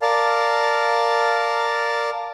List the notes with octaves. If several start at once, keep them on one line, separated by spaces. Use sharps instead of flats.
A#4 D5 F5 A5